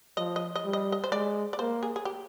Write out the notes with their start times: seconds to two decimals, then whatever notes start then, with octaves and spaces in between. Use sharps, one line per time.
0.17 F3 D#5
0.36 D#5
0.56 D#5
0.64 G3
0.73 D#5
0.92 D#5
1.04 C5
1.12 G#3 D5
1.53 D5
1.59 A#3 C5
1.83 G#4
1.96 G#4
2.05 G4